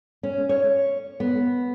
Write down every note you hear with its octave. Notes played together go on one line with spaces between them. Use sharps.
C#4
C#5
B3